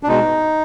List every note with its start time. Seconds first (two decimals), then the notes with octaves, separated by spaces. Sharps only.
0.03 D4
0.07 B2 G#3 D#4